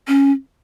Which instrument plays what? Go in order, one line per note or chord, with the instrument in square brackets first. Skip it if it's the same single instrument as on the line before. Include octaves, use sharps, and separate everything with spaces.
[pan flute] C#4